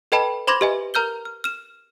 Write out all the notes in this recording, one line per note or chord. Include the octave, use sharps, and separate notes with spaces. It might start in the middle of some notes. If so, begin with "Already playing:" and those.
A4 B4 D#5 G5 A5 B5
C5 B5 C6 D6 G#6 A#6
G4 B4 D#5 E5 G#5
A#4 A#5 F6 G6 G7
F6
F6 E7